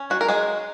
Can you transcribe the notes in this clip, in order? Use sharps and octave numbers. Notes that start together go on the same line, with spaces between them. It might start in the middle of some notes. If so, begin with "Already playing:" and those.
Already playing: C#4
F#3 F#4
A#4
F#3 G#3 G#4
F#3